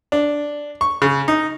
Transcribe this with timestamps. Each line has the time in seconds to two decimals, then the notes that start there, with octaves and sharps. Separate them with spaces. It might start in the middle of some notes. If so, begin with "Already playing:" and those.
0.12 D4
0.81 C#6
1.02 C#3
1.28 D#4